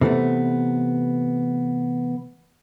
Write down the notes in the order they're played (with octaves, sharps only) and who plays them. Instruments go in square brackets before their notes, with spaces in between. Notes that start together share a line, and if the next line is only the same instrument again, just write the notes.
[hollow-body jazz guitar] C3 E3 A3 B3